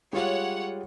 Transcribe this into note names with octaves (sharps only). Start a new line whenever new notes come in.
G3 G#3 F4 C#5 F#5